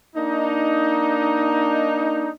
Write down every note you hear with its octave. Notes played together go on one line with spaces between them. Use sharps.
A#3 D4 D#4